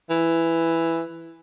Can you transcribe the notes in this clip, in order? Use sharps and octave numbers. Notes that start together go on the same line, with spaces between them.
E3